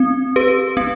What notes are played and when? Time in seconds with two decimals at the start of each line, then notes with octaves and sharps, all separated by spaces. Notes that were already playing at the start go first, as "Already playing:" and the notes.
Already playing: C4
0.36 G4 B4
0.77 C4